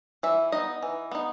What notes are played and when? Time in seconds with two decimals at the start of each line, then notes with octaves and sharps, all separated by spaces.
0.23 E3 E5
0.52 B3 D#4 D#5
0.82 E3
1.11 B3 D#4